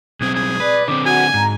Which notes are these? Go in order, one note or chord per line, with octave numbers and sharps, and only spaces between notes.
B1 C4 G#4
G#4
B4 D5
D3 C4 D6
F#4 G#5
G#2 A#5